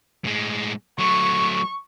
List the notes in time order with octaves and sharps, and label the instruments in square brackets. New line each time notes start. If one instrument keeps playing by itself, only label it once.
[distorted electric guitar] A2 G#3
[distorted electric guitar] F#3 A3 [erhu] C#6